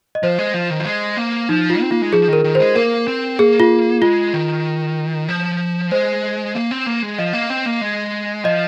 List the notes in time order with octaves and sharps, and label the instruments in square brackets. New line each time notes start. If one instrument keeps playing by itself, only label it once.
[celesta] D#5
[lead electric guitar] F3 [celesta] C5
[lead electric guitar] G#3
F3
D#3
F3
G#3
A#3
[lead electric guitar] F3 [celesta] D#4
[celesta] F4
[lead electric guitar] C4
[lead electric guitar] A#3 [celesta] F4
[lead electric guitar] G#3
[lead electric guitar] F3 [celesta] G#4
[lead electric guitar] D#3 [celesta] A#4
[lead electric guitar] D#3
[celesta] C5
[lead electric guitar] G#3
[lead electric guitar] A#3 [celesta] A#4
[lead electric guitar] C4
[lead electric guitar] A#3 [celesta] G#4
[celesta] F4
[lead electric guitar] G#3 [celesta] F4
[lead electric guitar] D#3
F3
[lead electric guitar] G#3 [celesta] C5
[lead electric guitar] A#3
C4
A#3
G#3
[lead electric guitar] F3 [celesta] D#5
[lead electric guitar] A#3
C4
A#3
G#3
[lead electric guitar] F3 [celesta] D#5